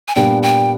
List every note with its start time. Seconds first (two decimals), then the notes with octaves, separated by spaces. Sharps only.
0.08 G#5
0.15 A#2 G3 B3 D4 G5
0.43 G5